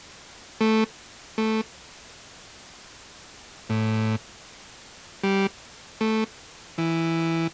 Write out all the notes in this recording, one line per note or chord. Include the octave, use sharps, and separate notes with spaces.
A3
A3
A2
G3
A3
E3